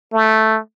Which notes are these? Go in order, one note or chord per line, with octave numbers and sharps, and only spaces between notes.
A3